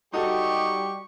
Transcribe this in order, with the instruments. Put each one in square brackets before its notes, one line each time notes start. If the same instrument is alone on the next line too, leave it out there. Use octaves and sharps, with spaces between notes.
[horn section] G3 G4 [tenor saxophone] D#4 [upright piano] F#4 A4 [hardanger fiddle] C#6